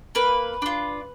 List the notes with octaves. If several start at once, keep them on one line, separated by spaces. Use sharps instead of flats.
A#3 B4
D4 F4